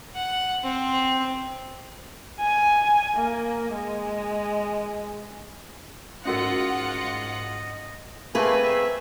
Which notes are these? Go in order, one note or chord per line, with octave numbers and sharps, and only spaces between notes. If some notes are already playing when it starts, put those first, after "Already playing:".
F#5
C4
G#5
A#3
G#3
G#2 C#4 F4 F#4 A#4 D#5 F#5
A3 A#3 C4 G#4 B4 G#5
E5